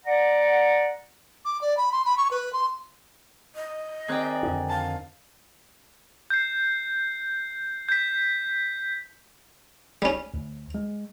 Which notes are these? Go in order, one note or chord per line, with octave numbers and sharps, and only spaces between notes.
D5 F#5 A#5
D6
D5
B5
C6
B5
C#6
B4
C6
D#5
D#3 C4 G#4 D5 G5 F#6
F2 D3 D4
F5 A5
G6 C7
G6 B6
G3 C#4
D2
G#3